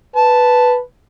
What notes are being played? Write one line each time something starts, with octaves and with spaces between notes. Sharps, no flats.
B4 A5